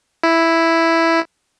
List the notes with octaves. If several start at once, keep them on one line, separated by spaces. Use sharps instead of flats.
E4